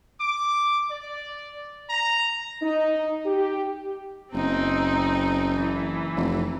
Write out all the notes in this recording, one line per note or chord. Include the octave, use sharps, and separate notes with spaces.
D6
D5
A#5
D#4
G4
F#1 C4 D#4
E3
F1